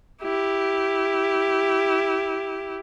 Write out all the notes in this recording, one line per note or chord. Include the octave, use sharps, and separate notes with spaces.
E4 G4